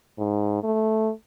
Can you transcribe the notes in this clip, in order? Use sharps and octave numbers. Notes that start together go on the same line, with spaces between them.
G#2
A3